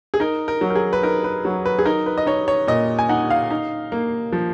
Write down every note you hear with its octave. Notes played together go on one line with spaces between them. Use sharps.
G#4
D#4 A#4
A#4
F#3
A#4
G#4
B4
D#4 A#4
B4
F#3
B4
G#4
D#4 A#4
B4
D#5
D#4 C#5
C#5
A#2 D#5
G#5
D#4 F#5
F5
D#4
A#3
F3